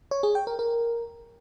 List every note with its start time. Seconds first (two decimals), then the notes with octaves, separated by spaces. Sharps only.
0.11 C#5
0.23 G#4
0.35 G5
0.47 A#4
0.59 A#4